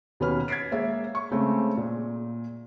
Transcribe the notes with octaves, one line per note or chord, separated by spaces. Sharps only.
D#2 B2 C#4 B4 B5 F6
G#6 A6 B6 C7 D7
G#3 A#3 C#5 E5
C#6
C#3 G#3 A3 C4
A#2